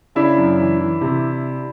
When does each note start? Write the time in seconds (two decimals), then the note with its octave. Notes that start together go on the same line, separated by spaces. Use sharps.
0.15 C#3 D4 E4
0.37 F#2
0.58 E3
0.80 E3
1.01 C3